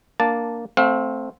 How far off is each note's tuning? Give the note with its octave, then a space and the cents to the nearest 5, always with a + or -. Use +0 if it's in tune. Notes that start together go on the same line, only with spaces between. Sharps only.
A#3 +0 D4 +5 A5 +0
A3 +0 C4 +0 F5 +30